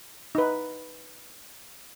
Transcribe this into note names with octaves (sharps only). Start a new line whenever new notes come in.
D#4 B4